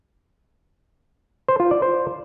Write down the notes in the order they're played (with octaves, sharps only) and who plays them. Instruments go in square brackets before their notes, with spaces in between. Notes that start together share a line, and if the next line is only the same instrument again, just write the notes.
[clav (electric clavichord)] C5
F4
D5
C5